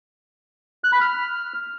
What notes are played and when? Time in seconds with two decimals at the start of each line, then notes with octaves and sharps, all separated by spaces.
0.84 F#6
0.93 B5
1.01 F6